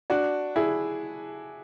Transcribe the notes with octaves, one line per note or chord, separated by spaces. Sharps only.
D4 F#4
E4 G#4